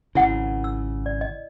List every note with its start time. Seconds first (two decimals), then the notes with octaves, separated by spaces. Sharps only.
0.15 G#1 C#3 E4 F#5
0.64 E6
1.06 D5
1.21 D#5